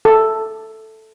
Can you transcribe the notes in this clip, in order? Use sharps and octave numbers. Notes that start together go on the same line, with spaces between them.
A4